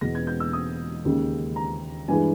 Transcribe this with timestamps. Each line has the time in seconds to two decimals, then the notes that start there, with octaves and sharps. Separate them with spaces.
0.01 E1 E2 B2 G#3 B3 A#6
0.15 G#6
0.27 G6
0.40 E6
0.53 D#6
1.05 D#2 C#3 G#3
1.56 A#5
2.08 G2 E3 G#3 G#5